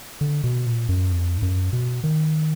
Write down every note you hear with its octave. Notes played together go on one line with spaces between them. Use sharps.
D3
B2
A#2
F#2
F2
G#2
F#2
B2
D#3